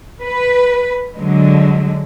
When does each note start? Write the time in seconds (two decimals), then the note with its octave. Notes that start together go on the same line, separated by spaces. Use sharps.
0.23 B4
1.16 D3 F#3 G#3